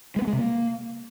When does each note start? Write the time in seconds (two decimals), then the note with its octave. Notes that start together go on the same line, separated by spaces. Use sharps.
0.16 G#3
0.22 B3
0.27 G#3
0.33 C3
0.38 A#3